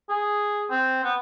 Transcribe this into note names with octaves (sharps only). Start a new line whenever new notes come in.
G#4
C4
B3